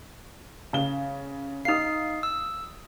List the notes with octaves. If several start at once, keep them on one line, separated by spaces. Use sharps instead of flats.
C#3 G7
D#4 F5 D#6 C7
E6